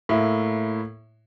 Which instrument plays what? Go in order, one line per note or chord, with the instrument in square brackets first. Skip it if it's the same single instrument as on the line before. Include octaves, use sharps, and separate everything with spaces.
[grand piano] A2 A#3 E4